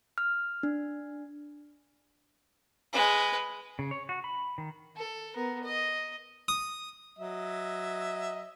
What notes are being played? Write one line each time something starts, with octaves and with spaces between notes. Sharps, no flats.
F6
D4
G#3 B4
C#3
C#5
F#4
B5
D#3
A4
B3 A#4
D#5
D#6
F#3 D#5 E5